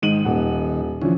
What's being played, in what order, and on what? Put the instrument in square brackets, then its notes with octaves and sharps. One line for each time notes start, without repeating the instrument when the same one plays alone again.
[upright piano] G#2 D#7 F#7 [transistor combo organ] D#3
[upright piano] D#1 F#5
[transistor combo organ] D3 E3 [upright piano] F3 C#4